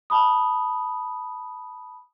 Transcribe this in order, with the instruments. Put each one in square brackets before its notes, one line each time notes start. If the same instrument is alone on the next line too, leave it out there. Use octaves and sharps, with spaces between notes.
[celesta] A5 B5 D#6